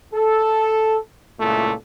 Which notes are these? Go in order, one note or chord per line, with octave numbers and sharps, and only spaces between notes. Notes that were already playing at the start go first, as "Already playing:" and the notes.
A4
C#2 A#2 A3 E4